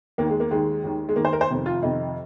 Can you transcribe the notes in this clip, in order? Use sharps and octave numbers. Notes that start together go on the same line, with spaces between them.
D#2 D#3 A#3
G#3
A#3
D#2 D#3 G#3
D#2 D#3
G#3
D#2 D#3 A#3
C5
A#4
C5
F2 C3 D#3
F4
F2 C3 D#3 D#4